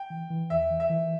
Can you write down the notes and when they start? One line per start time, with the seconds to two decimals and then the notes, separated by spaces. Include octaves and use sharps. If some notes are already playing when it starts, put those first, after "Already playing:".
Already playing: G5
0.10 E3
0.30 E3
0.50 E2 E5
0.70 E3
0.80 E5
0.90 E3